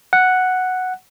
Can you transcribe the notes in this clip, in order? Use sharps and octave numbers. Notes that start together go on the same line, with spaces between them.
F#5